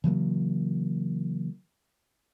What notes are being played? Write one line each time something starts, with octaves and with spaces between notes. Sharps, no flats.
C#3 E3 F#3 A#3